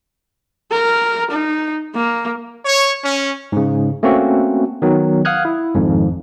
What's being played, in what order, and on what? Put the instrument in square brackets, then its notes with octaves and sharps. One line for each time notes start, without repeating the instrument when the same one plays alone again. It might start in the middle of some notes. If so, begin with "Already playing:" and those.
[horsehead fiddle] A#4
D#4
A#3
[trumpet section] C#5
C#4
[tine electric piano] G#2 C#3
A3 A#3 C4 C#4 F#4
D#3 F#3 B3
F5 F#5 D#6 F6 F#6 G#6
E4
G#1 F2 G#2